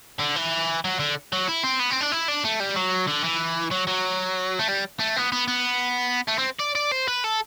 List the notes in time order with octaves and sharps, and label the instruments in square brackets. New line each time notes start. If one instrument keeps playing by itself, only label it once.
[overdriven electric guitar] D3
E3
F#3
D3
F#3
E4
C4
B3
C4
D4
E4
D4
A3
G3
F#3
D3
E3
F#3
F#3
A3
G3
A3
B3
B3
B3
A3
C4
D5
D5
C5
B4
A4